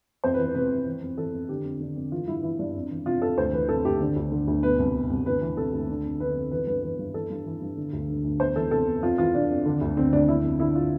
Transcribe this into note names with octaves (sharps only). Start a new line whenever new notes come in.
F2 C5
B4
E3
B4
C3 B4
F2
E3
F2
E3 A4
F2
D3 G4
F2
D3
F2
E3 F4
G2 E4
E3 E4
G2 D4
F2
E3
C3 F4
F2 A4
D2 C5
E3 B4
C3 A4
D2 G4
D3
D2
D3
D2
B2 B4
C2
B2
C2
D2 B4
E3
C3 A4
D2
D3
F2
D3 B4
F2
E3 B4
G2 B4
E3 B4
G2
E3 A4
G2
E3
G2
D3
D2
D3
D2
E2 C5
E3 A4
C3 A4
E2
F2 F4
E3 F4
C3 D4
F2
D3
D2
D3 C4
D2 D4
D3 E4
F2
D3 E4
F4